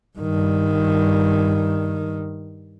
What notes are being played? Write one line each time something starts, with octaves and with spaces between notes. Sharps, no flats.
G2 D#3